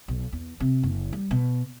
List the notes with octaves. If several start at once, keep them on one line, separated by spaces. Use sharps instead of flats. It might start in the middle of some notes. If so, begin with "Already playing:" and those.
B1
E2
C3
F#1
G3
B2